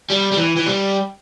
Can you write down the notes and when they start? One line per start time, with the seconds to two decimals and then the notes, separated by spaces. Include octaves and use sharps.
0.10 G3
0.32 G3
0.37 E3
0.57 E3
0.66 G3